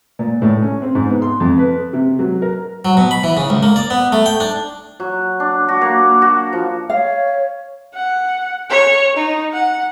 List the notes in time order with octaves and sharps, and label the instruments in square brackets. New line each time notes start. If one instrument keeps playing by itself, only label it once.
[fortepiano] A#2
A2
C#4
C4
G#2
B3
C6
F2
B4
C3
F#3
A#4
[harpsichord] F#3
B2
B5
E3
C#3
C#2
A#3
D5
B3
A3
G5
D4
[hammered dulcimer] F#3
D4
F#4
A#3
F#4
F3
[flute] C#5 [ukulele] F5
[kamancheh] F#5
C#5
D#4
F#5